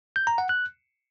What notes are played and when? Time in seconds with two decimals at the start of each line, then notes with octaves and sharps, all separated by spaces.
0.16 G6
0.27 A#5
0.38 F#5
0.49 F#6